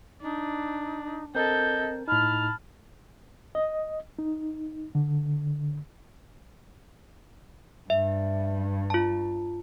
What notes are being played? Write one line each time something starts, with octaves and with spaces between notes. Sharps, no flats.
D4 D#4
C4 A4 A#4 D#5 G6
A2 D#4 A5 B5 F6
D#5
D#4
D3
G2 E5
F4 A5